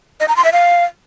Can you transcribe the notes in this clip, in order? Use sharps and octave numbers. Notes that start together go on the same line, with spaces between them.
D#5
A#5
C6
E5
F5